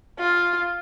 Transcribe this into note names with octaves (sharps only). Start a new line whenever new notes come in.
F4